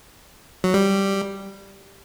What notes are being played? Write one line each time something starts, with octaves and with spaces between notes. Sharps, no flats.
F#3
G3